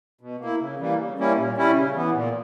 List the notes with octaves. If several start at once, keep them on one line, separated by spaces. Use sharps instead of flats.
B2
A#3 E4
C#3
E3 G3 A#3
C#3
G3 A#3 C#4 E4
A#2
G3 C#4 E4
C#3
E3 B3
A#2